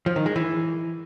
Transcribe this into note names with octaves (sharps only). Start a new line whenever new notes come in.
F3
D#3
G#3
E3